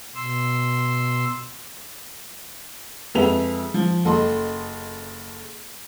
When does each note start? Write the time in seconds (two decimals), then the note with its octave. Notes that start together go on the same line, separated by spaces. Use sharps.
0.15 B2 C6 E6
3.15 F2 G#3 B4 E5 F7
3.74 F3
4.05 F#1 A4 D#5 C6